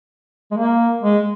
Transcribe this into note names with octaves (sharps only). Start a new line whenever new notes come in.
G#3
A#3
G#3